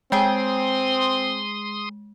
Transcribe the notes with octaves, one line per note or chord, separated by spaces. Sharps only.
G#3 C4 G#4 G5 C6 D#6